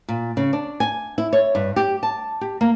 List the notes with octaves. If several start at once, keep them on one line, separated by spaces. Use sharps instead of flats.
A#2
C#3
D4
G#5
E4
C#5
G2
G4
A5
G4
A#3